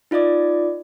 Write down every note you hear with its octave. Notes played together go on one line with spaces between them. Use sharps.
D#4 F4 D5 D#5 D6